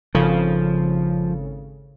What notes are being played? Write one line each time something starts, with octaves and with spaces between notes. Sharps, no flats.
G#1 C#3 F3 A4